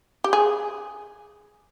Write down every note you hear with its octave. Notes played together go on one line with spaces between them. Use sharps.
G4
G#4